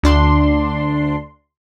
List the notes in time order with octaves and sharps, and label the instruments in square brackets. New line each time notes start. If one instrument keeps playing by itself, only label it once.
[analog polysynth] D2 D4 C6